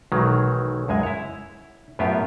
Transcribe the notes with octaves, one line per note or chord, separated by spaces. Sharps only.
B1 D#3 E3 F#3 G#3
C#2 F#2 G#3 G#5
E4 C#5
F#2 A2 B3 F4 G4 G#5